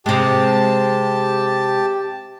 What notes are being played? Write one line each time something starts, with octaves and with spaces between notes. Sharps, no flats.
C3 G#3 G4 A5